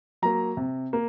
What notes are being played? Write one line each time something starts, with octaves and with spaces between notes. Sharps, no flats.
F#3 A#3 A#5
C3
A#3